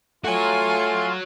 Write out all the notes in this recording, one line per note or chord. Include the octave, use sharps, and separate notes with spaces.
A3 F4 F#4 C#5 G#5